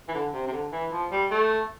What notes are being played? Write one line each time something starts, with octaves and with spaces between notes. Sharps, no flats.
E3
D3
C3
C3
D3
E3
F3
G3
A3